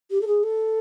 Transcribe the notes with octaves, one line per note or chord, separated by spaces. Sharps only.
G4
A4
G#4
A4